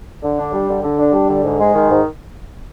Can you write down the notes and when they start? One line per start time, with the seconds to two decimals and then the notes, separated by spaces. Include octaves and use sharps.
0.22 D3
0.38 D4
0.53 G3
0.69 D3
0.83 D3
0.98 D4
1.13 G3
1.28 D3
1.44 G#2
1.59 G#3
1.75 D#3
1.89 G#2